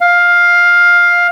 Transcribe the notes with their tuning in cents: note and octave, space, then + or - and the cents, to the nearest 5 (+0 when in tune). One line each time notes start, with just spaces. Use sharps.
F5 +10